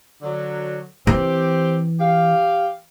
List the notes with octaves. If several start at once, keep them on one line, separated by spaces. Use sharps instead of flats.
D3 F#3
E3 C4 G4
G4 F5